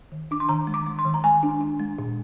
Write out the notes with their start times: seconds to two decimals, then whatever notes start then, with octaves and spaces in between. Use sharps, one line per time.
0.12 D#3
0.31 D4 D6
0.40 C6
0.49 D#3 A#5
0.67 G#3
0.74 D6
0.87 G#3
0.99 C6
1.05 D#3
1.14 A#5
1.24 G#3 G#5
1.43 D4
1.61 D4
1.80 G#3
1.99 A#2